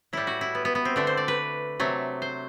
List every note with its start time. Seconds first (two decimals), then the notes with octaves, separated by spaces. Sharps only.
0.13 A2 G3 E4
0.27 F#4
0.41 E4
0.55 B3
0.65 B3
0.75 B3
0.85 C4
0.96 D3 A3 D4
1.07 C5
1.17 D5
1.28 B4
1.80 C3 F#3 A3
2.22 C5